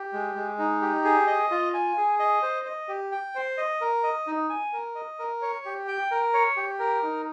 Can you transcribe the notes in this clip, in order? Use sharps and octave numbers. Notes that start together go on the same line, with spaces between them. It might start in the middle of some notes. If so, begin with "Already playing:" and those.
Already playing: G4
G#3
G#3
D#4
G4
G#4
D#5
F4
G#5
G#4
D#5
C5
D#5
G4
G5
C5
D#5
A#4
D#5
D#4
G#5
A#4
D#5
A#4
C#5
G4
G5
A#4
C#5
G4
A#4
D#4